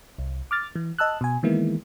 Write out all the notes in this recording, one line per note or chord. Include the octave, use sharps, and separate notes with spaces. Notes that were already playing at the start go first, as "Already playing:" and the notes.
C2
D6 F6 A6
E3
D#5 A5 E6 F#6
B2 G#5
D#3 E3 G#3 A#3 B3 E4